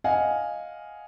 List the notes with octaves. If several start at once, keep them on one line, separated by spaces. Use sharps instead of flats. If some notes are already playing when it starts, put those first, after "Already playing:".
D#5 F5 F#5 G#5